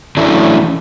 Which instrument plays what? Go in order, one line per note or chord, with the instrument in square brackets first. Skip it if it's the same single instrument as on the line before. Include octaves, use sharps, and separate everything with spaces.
[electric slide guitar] E3 F#3 A3 C#4 D4 E4